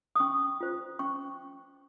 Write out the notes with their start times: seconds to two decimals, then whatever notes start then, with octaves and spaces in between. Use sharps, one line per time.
0.16 D#6
0.20 C#4 C#6
0.61 F4 C5
0.99 C#4 C#6